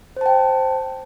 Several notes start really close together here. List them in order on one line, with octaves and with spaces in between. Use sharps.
C5 A5 G5